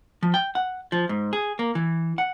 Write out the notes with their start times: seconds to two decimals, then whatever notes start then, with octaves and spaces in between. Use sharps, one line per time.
0.23 F3
0.34 G5
0.55 F#5
0.92 F3
1.09 G#2
1.33 G#4
1.59 A#3
1.75 E3
2.18 F#5